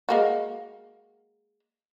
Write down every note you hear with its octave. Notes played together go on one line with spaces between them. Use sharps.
G#3 A#3 F#4